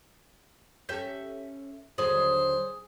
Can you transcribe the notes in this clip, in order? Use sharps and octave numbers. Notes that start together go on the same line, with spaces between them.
C#4 G4 A4 E5 G6
D#2 D3 F#3 G#4 C5